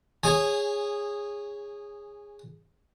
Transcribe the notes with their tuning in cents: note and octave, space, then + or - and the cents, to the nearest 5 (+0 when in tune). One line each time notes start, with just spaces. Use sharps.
G#4 -15 C#5 +0 G#5 +0